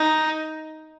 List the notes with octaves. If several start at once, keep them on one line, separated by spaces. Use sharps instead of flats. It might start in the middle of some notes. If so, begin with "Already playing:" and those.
Already playing: D#4